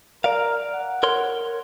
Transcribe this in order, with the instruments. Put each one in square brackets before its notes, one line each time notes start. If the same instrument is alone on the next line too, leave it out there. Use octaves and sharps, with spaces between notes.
[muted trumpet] A#4 [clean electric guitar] D5 F5
[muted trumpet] F#5
[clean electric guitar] A#4 C#5 C6